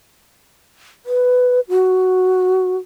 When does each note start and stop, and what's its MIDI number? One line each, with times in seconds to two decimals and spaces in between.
1.06 1.60 71
1.69 2.77 66